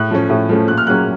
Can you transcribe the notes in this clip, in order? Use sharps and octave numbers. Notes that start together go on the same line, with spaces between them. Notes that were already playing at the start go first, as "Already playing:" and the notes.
Already playing: A2 F#6
F3 A3 C#4
A2
F3 A3 C#4
A#2 F#6
F6
F#3 A#3 C#4 F#6